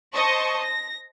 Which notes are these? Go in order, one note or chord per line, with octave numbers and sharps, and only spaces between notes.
C5 D#5 A5 C#6
A#6